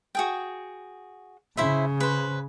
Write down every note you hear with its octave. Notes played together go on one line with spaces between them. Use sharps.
F#4 G#4 G5
C#3 E4 C5 E5
B4 C5